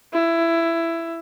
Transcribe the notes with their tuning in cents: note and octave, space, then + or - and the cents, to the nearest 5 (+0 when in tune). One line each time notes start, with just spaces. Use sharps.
E4 +15